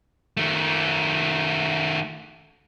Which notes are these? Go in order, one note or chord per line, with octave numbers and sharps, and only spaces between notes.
D#3 A3